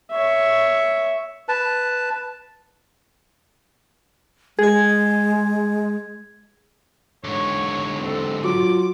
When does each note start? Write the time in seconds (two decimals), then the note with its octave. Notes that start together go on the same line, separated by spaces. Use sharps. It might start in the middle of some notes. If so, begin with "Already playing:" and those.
0.11 C#5 E5
1.48 B4 A5
4.59 G#3 G#4 G#6
7.24 G#2 D3 C#5
8.00 C4 A4
8.44 F#3 F4 D6